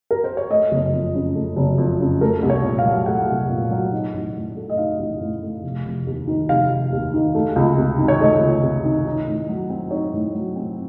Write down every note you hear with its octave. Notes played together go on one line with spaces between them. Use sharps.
A#4
C5
C#5
A3 D#5
F#1
F2
C#3
A3
F#1
F2
C#3
A3 A#4
C2
C#5
A#2
F5
F#3
A3 F#5
C2
A#2
F#3
D#4
A1
A2
A3
D#5
D#4 F5
A1
A2
A3
F1
F1
D#2
D#3
F1 F5
F1
D#2
D#3
A3
C#2
C3
D#3
C#5
A3 D#5
C#2
C3
D#3
D#4
A2
F#3
C4
D#4 C#5
A2
F#3
C4